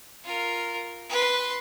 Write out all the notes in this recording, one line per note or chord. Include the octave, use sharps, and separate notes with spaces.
F4 A#4
B4 C6